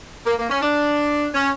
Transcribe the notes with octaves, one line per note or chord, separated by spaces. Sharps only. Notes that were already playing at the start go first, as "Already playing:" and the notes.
A#3
A#3
C#4
D4
C#4